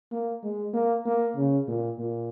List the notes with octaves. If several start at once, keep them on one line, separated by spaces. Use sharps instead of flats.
A#3
G#3
A#3
A#3
C#3
A#2
A#2